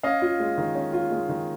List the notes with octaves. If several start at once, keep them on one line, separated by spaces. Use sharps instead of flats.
C#4 D#5 F5
F4
G#3
D#3
C#4
F4
G#3
D#3